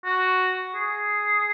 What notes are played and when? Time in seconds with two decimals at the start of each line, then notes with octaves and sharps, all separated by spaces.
0.05 F#4
0.75 G#4